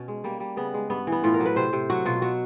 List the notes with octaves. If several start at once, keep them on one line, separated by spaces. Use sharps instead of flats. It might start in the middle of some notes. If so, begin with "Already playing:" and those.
Already playing: B2 C#4
G#3
G3 A#3
G3
C#3 B3
G#3
G2 B3
E3
B3
A2 F4
A#4
F#3
B4
C3 C5
C3
F#3 F#4
B2 F4
F#3 F#4